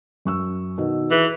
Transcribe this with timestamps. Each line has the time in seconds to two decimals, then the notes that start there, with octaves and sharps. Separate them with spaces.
0.25 F#2 C#6 E6
0.78 B2 D#3
1.11 E3 G#4